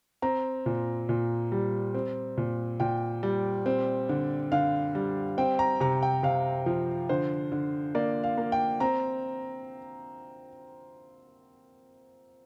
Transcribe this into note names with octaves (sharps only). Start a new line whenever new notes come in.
C4 A#5
A#2
A#2
G3
C4
A#2
A#2 G5
G3
C4
D3
D3 F5
G3
C4 G5
A#5
C3 A#5
G5
C3 F5
F3
D3 C5
D3
A#3 D5
F5
A#3
G5
C4 A#5